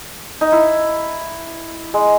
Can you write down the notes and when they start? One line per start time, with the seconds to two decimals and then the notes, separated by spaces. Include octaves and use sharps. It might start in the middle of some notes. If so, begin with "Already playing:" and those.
0.41 D#4
0.52 E4
1.94 G#3